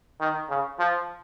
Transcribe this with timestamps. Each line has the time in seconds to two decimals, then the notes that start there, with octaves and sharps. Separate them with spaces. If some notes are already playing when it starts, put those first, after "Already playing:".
0.20 D#3
0.49 C#3
0.79 F3